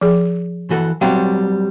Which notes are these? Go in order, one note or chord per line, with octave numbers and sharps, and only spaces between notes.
F3 G#4
E3 F#4 A4
F#3 G3 C4 F5 G5